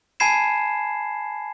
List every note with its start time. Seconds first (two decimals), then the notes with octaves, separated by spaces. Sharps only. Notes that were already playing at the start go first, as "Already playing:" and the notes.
0.20 G#5 A5 B5 G#6 C7 E7